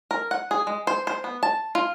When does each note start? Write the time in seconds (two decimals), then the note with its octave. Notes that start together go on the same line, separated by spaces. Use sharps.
0.11 A#4
0.31 F#5
0.51 G#4
0.67 G#3
0.87 C5
1.07 C5
1.24 B3
1.43 A5
1.75 F4